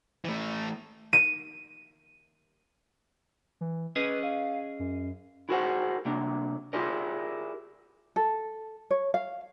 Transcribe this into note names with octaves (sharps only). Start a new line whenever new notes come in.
E3 A3
D#7
E3
C#4 G#4 B4 D#5
F5
F#2
E4 F#4 G#4 A#4 C5 F#5
C3 A#3 D4
E4 F4 G4 G#4 A#4 D5
A4
C#5
F5